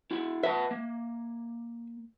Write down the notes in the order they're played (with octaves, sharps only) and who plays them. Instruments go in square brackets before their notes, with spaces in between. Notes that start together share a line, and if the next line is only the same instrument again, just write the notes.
[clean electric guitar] E4 F#4
[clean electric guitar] B4 F#5 A5 [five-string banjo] E5
[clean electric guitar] A#3